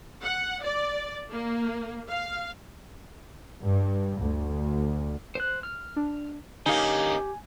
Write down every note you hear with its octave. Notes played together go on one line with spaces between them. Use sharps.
F#5
D5
A#3
F5
G2
D2
C5 F#6
F6
D4
D3 A#3 C#4 D#4 G4 G#5